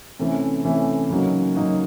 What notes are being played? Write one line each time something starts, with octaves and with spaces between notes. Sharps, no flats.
C3 E3 A3 C#4
C3 E3 A3 C#4
C#3 F#3 A#3 D#4 F#4
C#3 F#3 A#3 D#4 F#4